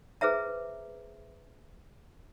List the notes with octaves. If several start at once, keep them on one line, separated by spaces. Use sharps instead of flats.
G#4 B4 C5 E5 A#5